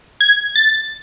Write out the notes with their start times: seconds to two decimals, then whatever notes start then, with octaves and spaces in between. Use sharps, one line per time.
0.20 G#6
0.55 A6